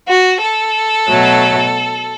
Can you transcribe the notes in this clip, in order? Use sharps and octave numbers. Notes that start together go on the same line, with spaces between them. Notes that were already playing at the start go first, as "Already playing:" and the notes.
F#4
A4
B2 F#3 A3